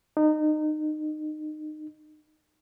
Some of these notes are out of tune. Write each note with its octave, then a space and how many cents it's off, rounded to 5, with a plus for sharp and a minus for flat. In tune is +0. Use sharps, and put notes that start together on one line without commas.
D#4 -25